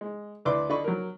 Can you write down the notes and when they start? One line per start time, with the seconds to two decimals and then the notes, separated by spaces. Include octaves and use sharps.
0.01 G#3
0.45 D2 E4 B4 D5 C6 D6
0.69 D3 D5 D#5 B5 C#6
0.84 F#3 A#4